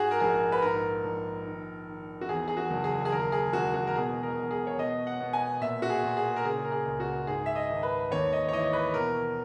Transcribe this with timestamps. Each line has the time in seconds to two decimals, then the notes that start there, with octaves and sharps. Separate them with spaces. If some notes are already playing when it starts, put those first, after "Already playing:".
Already playing: G#2 F#4 G#4
0.11 A#4
0.20 A#1 G#4
0.52 B4
0.62 G#2 A#4
1.04 A#1
1.45 D#3
1.88 D#3
2.21 F#4
2.29 E2 G#4
2.48 G#4
2.57 F#4
2.70 F#1
2.84 G#4
3.05 G#4
3.12 D#2 A#4
3.32 G#4
3.53 E1 F#4
3.74 F#4
3.87 A#4
3.96 B2 G#4
4.23 A#4
4.37 B2
4.51 G#4
4.67 C#5
4.78 B2 D#5
5.07 F#5
5.20 B2
5.33 G#5
5.61 A#2 E5
5.82 F#4
5.90 G#4
6.03 A#2
6.17 G#4
6.36 A#4
6.44 C#3 G#4
6.64 A#4
6.72 G#4
6.86 C#2
7.00 F#4
7.27 G#2 G#4
7.46 E5
7.55 D#5
7.69 G#1
7.83 B4
8.11 D#2 C#5
8.33 D#5
8.48 C#5
8.52 E3 D#5
8.73 B4
8.94 B2 A#4